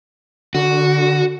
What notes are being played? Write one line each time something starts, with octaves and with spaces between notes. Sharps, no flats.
D3 F#4